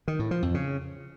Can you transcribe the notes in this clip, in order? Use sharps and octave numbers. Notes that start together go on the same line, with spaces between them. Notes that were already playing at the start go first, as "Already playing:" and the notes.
D#3
A2
F3
F2
C#3